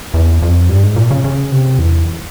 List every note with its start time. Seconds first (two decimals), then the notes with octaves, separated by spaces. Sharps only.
0.14 E2
0.42 F2
0.69 G2
0.83 G#2
0.96 A#2
1.11 C#3
1.24 C#3
1.52 C3
1.79 E2